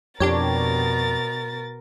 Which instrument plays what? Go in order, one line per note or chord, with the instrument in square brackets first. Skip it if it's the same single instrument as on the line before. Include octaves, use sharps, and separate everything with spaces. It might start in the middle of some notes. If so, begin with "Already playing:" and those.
[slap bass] F2 [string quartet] B2 A#4 A6 [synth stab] D4 G4 C#5